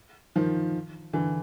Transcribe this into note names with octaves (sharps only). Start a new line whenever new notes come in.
D#3 F3
D3 E3